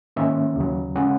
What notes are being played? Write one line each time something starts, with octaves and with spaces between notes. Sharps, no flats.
G#2 D#3 A#3 C#4 E5
D#2 C#3 F#3
C#3 G#3 C#4 F#5